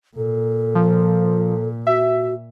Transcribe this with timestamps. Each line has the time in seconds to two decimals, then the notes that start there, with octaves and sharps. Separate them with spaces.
0.17 A#2 A4
0.75 F3
1.87 F#4 E5